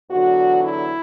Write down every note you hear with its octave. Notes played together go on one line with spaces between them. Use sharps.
E2 D3 F#3 F#4
E4